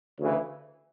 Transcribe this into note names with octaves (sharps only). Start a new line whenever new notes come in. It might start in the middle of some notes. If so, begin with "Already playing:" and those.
D2 C#3 E3